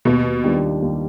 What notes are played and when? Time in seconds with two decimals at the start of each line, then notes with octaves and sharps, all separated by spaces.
0.05 D#2 B2
0.44 D#3 G3 D4 F4
0.82 D#2